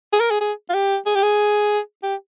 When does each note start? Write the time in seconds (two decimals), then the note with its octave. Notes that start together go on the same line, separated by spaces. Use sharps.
0.13 G#4
0.20 A#4
0.31 G#4
0.41 G#4
0.70 F4
0.74 G4
1.06 G#4
1.15 G4
1.23 G#4
2.03 G4